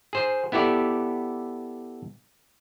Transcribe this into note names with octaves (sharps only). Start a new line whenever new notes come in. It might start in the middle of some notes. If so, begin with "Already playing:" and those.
G#4 C5
B3 E4 G4 A4 D5